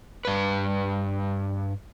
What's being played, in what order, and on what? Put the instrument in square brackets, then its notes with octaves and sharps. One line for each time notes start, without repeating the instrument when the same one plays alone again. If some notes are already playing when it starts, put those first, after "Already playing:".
[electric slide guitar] G2 B4